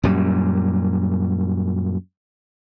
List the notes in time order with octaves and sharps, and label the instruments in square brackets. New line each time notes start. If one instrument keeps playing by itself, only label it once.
[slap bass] F#2 A#2 G3